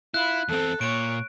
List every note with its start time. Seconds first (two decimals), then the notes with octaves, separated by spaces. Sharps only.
0.14 E4 F4 B5 F#6
0.48 E2 C4 A4
0.81 A#2 C#5 D7